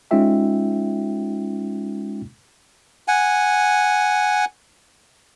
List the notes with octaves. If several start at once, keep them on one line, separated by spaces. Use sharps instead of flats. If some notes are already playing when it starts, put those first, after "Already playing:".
G#3 C#4 D#4 F4 E5 G5
F#5 G#5